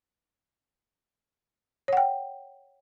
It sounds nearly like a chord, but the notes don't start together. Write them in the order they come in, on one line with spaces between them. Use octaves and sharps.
C#5 F#5 G5